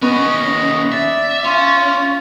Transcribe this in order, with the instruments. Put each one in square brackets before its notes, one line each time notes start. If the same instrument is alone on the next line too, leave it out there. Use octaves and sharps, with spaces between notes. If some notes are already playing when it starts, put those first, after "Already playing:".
[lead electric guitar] D#2 C#4 [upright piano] B3 [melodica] D#5
[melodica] D5 [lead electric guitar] E5
[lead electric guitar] C#4 [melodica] F4